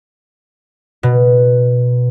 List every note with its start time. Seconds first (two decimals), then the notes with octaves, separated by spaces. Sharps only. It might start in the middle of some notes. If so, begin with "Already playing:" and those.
1.03 B2